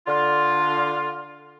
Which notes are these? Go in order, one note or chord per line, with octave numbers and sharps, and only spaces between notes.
D3 F4